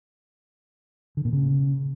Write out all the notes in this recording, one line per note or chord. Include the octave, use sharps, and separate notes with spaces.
D3
A#2
C#3